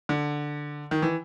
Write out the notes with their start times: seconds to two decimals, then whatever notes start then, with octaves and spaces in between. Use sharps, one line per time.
0.09 D3
0.91 D#3
1.02 E3